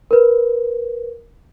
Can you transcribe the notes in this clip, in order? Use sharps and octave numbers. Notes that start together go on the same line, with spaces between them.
A#4 B4